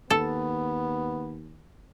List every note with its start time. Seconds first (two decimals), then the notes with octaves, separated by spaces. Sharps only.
0.10 D#2 B3 A4